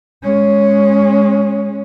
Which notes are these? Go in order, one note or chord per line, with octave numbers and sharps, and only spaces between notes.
G#3 C#4